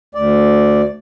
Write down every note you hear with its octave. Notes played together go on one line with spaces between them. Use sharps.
D2 D5